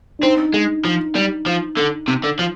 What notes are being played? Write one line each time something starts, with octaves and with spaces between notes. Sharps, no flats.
D4
C4 D#4
G#3
F3
G3
F3
D3
C3
D3
F3